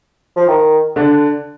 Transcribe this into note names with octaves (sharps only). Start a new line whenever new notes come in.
F3
D#3
D3 D4